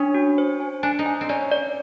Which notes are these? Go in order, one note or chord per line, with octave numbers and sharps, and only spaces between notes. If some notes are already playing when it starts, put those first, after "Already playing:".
Already playing: C#4 D4
F#4
C5
G#5
D4 G#5
D#4
G#5
C4
C#4 D5
D5